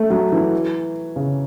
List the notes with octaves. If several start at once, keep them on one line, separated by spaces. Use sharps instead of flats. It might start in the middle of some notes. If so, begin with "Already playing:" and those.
Already playing: A3
F#3
E3
C#3